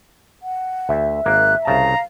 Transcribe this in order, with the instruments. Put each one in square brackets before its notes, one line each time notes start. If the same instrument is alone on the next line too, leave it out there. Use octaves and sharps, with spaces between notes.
[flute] F#5
[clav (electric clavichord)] D2 [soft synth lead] E5
[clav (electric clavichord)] G#1 A#3 [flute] F#6
[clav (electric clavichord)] C2 C#3 A5 [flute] F5 [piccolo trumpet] A#5